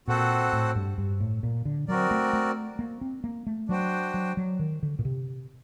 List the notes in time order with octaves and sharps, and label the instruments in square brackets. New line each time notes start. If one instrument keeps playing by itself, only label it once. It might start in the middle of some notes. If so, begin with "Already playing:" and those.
[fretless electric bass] A#2 [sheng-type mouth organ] C4 F#4 A4 C5 F#5
[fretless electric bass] A2
G2
G2
A2
A#2
D3
[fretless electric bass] F#3 [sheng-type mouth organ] C4 F#4 A#4 D5
[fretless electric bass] A3
A3
A#3
C4
A#3
A3
[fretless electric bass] F#3 [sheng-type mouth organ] D4 F#4 C5 G5
[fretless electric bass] F#3
F#3
D#3
D3
A#2
C3